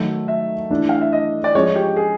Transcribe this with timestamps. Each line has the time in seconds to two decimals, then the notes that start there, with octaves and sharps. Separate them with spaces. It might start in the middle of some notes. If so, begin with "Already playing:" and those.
Already playing: D#3 F#3 A3
0.28 E5
0.70 E3 A3 D4
0.89 F5
1.01 E5
1.12 D#5
1.44 D5
1.55 F3 G#3 C#4 C#5
1.75 G4
1.96 G#4